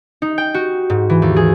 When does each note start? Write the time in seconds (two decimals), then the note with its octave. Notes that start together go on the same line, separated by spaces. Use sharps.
0.22 D#4
0.38 G5
0.54 F#4
0.90 G#2
1.10 E3
1.22 D#2
1.36 G#4